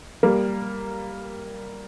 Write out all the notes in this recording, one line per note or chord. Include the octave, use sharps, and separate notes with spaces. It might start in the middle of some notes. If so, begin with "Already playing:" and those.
G3 A#3